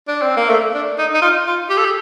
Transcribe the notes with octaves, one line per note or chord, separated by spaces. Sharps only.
D4
C4
A#3
A3
D4
D#4
D#4
F4
F4
G4
A4
G4